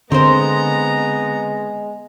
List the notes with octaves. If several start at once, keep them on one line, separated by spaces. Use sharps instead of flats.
D3 G#3 B3 C4 A#4 C5 A#5